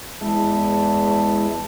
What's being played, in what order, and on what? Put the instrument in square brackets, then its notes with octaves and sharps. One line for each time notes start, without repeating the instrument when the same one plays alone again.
[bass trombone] E2 [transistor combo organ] G#3 E4 [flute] A5